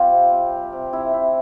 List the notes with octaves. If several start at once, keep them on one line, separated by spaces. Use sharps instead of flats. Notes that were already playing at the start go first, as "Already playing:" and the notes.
Already playing: G3 C4 F4 G4
C3
C4
G3
C3
C3 E4
C4 E4